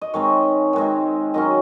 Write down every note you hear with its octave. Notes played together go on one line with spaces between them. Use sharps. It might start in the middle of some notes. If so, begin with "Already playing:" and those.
D#5
D#3 G#3 C4 C#5
D#3 G#3 C4
D#3 F#3 C#4 D#5